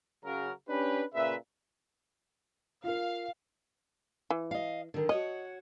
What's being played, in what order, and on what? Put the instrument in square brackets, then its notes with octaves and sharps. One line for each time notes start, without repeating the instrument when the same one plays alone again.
[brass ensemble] C#3 F#3 A#4
C#4 D4 G4 B4
A#2 C#3 B4 E5
[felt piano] F4 A#4 [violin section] F5
[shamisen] E3
[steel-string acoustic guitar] D#5 F5
D3 D#3
[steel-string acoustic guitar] F#4 C#5 F#5 [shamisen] D#5